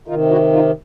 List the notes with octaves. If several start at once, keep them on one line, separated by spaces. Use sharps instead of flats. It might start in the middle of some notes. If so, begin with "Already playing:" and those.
C3 D#3 D#4 F4
E4 F#4
D#4 F4